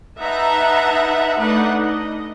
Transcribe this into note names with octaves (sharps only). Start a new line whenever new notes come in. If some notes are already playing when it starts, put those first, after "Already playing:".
D#4 B4 E5 F#5 A5 A#5
A3 D4 D#4 B4 F#5
D#5